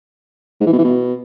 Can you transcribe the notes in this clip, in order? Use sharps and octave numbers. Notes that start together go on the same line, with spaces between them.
G#2
E3
B2
E3
B2